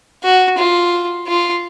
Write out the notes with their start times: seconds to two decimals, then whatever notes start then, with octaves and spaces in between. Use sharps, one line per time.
0.24 F#4
0.58 F4
1.28 F4